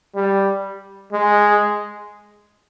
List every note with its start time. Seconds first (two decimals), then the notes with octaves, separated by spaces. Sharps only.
0.15 G3
1.13 G#3